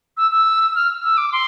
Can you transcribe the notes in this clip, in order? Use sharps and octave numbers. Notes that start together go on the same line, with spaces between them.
E6
E6
F6
E6
D6
C6